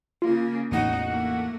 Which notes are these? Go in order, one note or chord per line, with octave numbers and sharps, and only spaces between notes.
C#3 A#3 F4
A1 E2 A2 D#4 F#4
A3 A#3